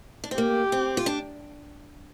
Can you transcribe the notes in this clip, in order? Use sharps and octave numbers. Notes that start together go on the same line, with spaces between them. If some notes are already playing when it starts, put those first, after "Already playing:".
D4
C4
A#3 G4
C4
F4
D4